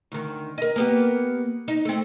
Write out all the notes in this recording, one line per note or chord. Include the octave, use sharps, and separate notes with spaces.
D2 D#3
A#4 D#5
A#3 B3 G4
D#4
A3 C4